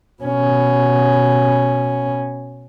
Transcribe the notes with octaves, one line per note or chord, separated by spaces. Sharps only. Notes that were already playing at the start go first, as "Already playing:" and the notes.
B2 C#4